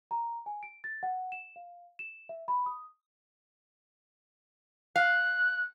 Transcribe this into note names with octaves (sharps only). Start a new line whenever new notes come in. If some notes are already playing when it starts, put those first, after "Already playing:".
A#5
G#5
D7
A6
F#5
E7
F5
E7
E5
B5
D#6
F5 F#6